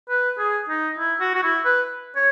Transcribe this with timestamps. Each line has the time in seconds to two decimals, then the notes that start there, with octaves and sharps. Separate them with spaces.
0.09 B4
0.39 G#4
0.69 D#4
0.99 E4
1.20 F#4
1.34 F#4
1.43 E4
1.65 B4
2.16 C#5